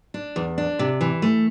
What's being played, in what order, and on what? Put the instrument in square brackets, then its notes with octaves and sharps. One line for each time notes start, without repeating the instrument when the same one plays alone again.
[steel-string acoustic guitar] D4
E2
D4
C3
E3
A3